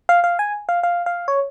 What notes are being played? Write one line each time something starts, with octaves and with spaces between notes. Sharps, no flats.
F5
F5
G#5
F5
F5
F5
C#5